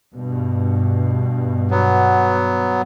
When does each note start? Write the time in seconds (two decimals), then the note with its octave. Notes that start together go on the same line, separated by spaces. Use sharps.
0.15 G2 B2
1.71 F#3 B3